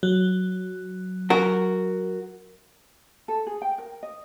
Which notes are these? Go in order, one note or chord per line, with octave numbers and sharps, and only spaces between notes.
F#3
F#4 A#4
A4
G#4
G5
A#4
D#5